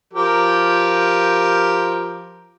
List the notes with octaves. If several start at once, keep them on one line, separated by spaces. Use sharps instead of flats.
F3 G4 A#4